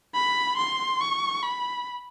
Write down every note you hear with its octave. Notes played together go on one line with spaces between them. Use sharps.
B5
C6
C#6
B5